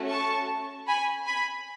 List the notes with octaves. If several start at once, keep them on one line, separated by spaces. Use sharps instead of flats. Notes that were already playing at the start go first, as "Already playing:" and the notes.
Already playing: A3 C#4 F#4 A4
A5 C#6
G#5 B5
G#5 B5